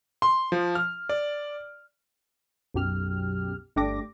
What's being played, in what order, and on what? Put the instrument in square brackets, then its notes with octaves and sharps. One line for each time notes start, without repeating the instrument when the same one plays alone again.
[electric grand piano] C6
F3
F6
D5
[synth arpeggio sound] B1 F#2 G4 F6
G1 A3 D4 G4 D6 A#6